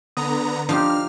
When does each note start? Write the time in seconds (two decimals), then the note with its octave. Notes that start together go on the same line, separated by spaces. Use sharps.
0.17 D3 B3 A#5 D#6
0.69 F3 D4 D#4 G4 F6